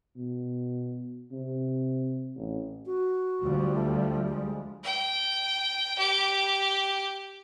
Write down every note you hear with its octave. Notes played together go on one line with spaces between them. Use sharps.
B2
C3
A1
F#4
D2 F3 G3
A3
G#3
G5
G4